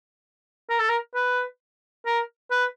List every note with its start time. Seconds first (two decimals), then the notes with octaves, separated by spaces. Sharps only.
0.70 A#4
0.79 A4
0.89 A#4
1.15 B4
2.06 A#4
2.51 B4